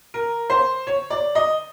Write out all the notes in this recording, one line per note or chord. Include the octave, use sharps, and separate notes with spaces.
A#4
C5
C#5
D5
D#5